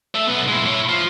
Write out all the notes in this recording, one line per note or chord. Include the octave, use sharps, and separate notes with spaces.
A3 E5
B1 B3
G#3 E4
E4 C#5
F4 C5